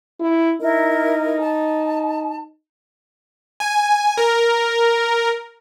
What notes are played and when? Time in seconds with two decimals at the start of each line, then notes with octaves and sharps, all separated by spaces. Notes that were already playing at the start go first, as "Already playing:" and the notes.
0.20 E4
0.61 D#4 E4 A#4
1.40 A5
3.60 G#5
4.17 A#4